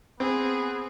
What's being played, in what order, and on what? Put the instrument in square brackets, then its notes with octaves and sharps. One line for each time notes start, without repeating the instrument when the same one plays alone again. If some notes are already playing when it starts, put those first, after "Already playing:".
[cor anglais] B3 [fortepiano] C4 [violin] G#4